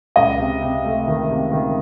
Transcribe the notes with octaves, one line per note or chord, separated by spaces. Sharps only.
C#2 D#5
C3
C3
A3
D#3
C3
D#3